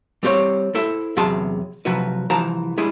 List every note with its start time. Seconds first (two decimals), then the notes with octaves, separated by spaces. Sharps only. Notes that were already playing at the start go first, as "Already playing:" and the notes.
0.23 G3 C4 G4 C5 C#5
0.74 E4 A4 C5 E5
1.17 E2 C3 F#3 G#4 A5 C6
1.85 C3 F3 F#3 F#4 B4
2.30 C2 E3 F3 C5 A5 A#5
2.78 G3 G#3 E4 G#4